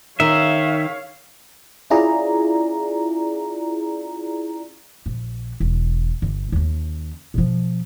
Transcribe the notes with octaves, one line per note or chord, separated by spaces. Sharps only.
D#3 C#5 E5 F5
C#4 E4 F4 G#4 D5 A#5
A#1
E1
G1
D#2 C#4
B2 F3